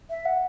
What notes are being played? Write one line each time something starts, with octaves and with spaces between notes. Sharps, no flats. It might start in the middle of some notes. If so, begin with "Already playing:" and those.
E5
F#5